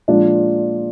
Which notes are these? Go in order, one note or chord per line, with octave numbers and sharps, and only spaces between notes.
A#2 F3 G#3 D4 F4